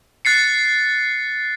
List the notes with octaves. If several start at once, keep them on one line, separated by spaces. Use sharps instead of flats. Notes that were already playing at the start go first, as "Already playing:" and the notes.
F#6 A6 C7 C#7